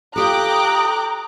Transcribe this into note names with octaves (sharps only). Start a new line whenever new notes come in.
F4 G4 A4 G5 A#5 D6 D#6 F#6